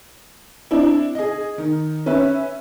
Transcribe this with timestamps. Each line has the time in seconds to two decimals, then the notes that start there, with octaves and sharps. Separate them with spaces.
0.71 C4 D4 E4
1.15 G#4 D#5
1.58 D#3
2.06 C#4 B4 E5